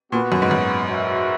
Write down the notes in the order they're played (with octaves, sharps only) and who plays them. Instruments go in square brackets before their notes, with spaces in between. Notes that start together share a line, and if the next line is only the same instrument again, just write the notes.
[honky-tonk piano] A#2 [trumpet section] B3 F#4 B4
[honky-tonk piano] F#2
G#2
F#2
[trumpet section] F#4 B4 E5